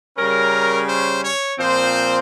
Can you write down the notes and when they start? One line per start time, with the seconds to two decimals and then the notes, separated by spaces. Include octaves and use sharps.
0.17 C#3 G3 C#4 A#4
0.88 C5
1.23 C#5
1.59 A#2 F3 C4 C5